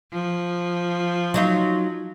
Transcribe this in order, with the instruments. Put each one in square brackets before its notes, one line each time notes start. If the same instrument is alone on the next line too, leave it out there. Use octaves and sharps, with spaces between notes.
[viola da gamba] F3
[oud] F#3 D#4 F4